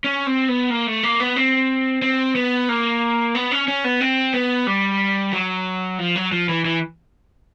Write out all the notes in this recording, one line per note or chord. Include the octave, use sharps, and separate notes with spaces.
C#4
C4
B3
A#3
A3
A#3
B3
C4
C4
B3
A#3
B3
C#4
C#4
B3
C4
B3
G3
F#3
F3
F#3
F3
E3
E3